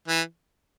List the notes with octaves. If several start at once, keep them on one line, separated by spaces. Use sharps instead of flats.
E3